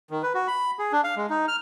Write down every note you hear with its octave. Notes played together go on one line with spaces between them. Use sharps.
D#3
B4
F#4
B5
G#4
D4
F5
G#3
D#4
F6